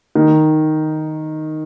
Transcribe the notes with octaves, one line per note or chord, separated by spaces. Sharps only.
D#3